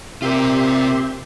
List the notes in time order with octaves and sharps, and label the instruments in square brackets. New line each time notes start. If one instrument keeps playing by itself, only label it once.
[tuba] C3 [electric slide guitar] F4 A#4 [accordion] G4 E5 C6